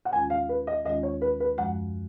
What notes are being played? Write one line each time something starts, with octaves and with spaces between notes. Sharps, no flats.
F#5
D#2 D#3 G#3 C#4 F4 G#5
F5
B4
D#5
D#2 D#3 G#3 C#4 F4 D#5
C#5
B4
B4
F#2 F3 G#3 F#5